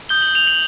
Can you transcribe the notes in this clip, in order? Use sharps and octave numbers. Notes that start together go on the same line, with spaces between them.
D#6 G6 G7
F#7
F7
F#7